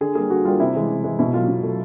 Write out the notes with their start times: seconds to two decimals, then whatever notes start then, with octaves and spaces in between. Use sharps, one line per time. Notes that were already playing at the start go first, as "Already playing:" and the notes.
0.01 D3 G#4
0.15 G3 A#3 G#4
0.30 D3 F#4
0.45 G3 A#3 F4
0.60 C3 E4
0.75 E3 G#3
0.89 C3
1.04 E3 G#3
1.19 B2 E4
1.34 F#3 A3 F4
1.48 B2
1.63 F#3 A3